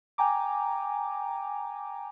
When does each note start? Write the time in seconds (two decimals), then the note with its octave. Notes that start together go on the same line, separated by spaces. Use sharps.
0.18 G5 G#5 A#5 D6